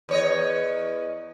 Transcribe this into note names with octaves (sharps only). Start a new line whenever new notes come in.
E2 C#5 D#5